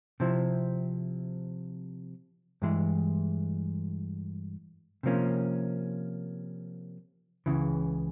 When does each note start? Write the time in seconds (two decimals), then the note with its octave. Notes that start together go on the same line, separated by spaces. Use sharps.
0.20 C3 F3 C4 E4
2.62 G2 E3 G#3
5.03 C3 F3 A#3 C#4
7.46 C#2 C#3 E3